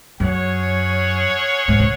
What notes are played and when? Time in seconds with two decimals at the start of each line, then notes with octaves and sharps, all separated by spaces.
0.20 F#2 C#4 G#4 C#5 F#5
1.68 G#2
1.80 C#3